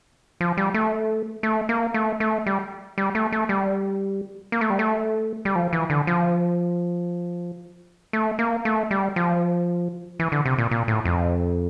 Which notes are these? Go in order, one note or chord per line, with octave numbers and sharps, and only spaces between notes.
F3
G3
A3
A3
A#3
A3
A3
G3
G3
A3
A3
G3
A#3
A3
G3
A3
G3
F3
E3
D3
F3
A3
A#3
A3
G3
F3
E3
D3
C3
A#2
A#2
A2
F2